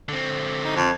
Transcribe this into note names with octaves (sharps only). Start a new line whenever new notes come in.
D3 C4
D#4
F2